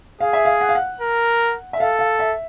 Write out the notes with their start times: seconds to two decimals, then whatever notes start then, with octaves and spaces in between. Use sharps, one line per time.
0.20 G#4 F5
0.33 E5
0.45 F5
0.61 F#5
0.69 F5
0.75 F#5
1.01 A#4
1.73 E5
1.80 A4 F5
1.99 F5
2.19 E5